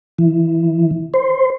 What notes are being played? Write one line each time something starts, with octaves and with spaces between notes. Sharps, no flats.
E3
C5